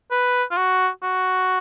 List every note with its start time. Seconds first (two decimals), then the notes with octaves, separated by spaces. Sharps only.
0.11 B4
0.51 F4
0.56 F#4
1.02 F#4